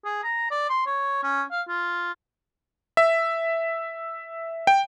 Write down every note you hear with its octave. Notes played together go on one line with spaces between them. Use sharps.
G#4
A#5
D5
C6
C#5
C#4
F5
F4
E5
G5